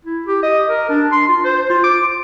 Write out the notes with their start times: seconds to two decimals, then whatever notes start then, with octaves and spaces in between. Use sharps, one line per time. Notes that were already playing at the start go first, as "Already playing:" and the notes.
0.05 E4
0.26 G4
0.43 D#5
0.68 A#4
0.89 D4
1.12 C6
1.28 F4
1.44 C5
1.70 F4
1.84 D6